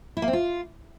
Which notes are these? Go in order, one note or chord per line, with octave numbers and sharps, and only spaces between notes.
E4
A#3
C4
F4